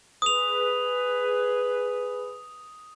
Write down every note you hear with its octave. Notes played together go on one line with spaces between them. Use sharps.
G#4 B4 D#6 F7